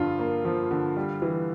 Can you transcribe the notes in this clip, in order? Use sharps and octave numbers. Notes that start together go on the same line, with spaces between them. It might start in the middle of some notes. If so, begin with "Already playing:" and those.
Already playing: G2 D3 F3 F4
A#3
F3
D3
G3
E3